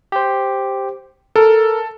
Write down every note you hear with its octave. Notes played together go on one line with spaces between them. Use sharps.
G4 C5
A4 A#4